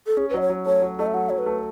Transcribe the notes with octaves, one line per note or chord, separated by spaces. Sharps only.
A4
C#4 G#4
B4
F#3 D#5
C#5
F#3
A3 C#5
F#3
A3 D#5
E5
F#3 F#5
F#3 C#5
B4
A3